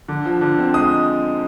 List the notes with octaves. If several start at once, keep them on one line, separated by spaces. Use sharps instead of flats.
D3
F3
D3
C4
G#3 D#6